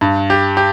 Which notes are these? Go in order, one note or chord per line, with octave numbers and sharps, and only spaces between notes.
G2
G4
G4